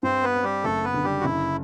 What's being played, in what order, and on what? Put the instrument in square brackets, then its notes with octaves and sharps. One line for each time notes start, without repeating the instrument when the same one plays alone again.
[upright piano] G2 [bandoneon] C4 C5
[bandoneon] B3 B4
[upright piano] C4
[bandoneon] G3 G4
[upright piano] F#1 [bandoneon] A3 A4
[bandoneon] B3 B4
[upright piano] D3
[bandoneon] G3 G4
F#4
[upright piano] F#1 [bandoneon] E4